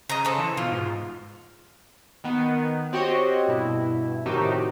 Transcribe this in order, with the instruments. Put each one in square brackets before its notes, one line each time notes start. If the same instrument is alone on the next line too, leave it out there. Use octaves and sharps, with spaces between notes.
[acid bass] C#3 [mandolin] D#5 A#5
[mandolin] C4 A4
[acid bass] E3
[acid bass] B2 [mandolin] F4
[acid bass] G#2
[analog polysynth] D#3 B3
C4 F#4 G4 C#5 D#5
G2 B2 E4
A2 C3 D#3 D#4 F#4 G4